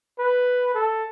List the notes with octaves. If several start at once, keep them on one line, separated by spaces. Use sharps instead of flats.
B4
A4